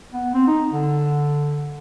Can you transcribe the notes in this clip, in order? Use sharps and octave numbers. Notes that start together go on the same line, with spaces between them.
B3
C4
D#4
D3